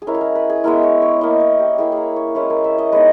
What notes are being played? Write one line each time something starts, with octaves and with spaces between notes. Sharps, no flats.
G#4
G#3 C#4 E4 A#4
G#4
A#4
B4
G#4
G#3 B3 E4 A#4
C#5
C#5
A#3 E4 D#5
C#5
G4
A#3 E4 G#4
G#4
A#4
C#5
G#3 C#4 E4 B4
A#4
E5
D#5
G#3 B3 D#4 B4